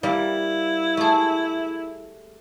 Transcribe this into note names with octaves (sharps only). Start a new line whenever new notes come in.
G3 A#3 E4
A3 G#4